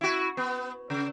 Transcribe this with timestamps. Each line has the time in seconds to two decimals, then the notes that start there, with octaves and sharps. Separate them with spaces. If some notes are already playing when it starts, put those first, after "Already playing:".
0.01 E4 F#4
0.37 B3
0.90 C#3